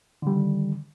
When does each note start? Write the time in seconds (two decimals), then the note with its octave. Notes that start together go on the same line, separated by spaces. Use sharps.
0.22 D3
0.27 G3
0.31 D#3